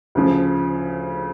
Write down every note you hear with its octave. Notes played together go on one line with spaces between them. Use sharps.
D2 C#3 F3